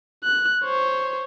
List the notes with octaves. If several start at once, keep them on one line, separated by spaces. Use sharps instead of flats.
F#6
C5 C#5